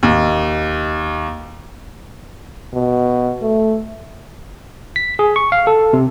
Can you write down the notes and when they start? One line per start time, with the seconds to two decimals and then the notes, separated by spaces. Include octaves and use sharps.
0.03 D#2
2.74 B2
3.42 A3
4.96 B6
5.19 G#4
5.36 C#6
5.52 F5
5.67 A4
5.93 C3